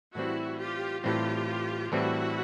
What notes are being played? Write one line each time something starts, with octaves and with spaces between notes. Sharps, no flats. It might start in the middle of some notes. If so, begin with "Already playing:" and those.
A2 E3 G3 C4 E4 F#4
F4 G4
A2 E3 G3 C4 F4 G4
A2 E3 G3 C4 E4 F#4